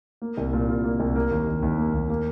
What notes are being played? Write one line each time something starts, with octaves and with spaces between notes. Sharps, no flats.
A#3
C2
A#2
F4
A#3
C2
A#3
D#2
D#3
D#2
A#3
D#2
A#3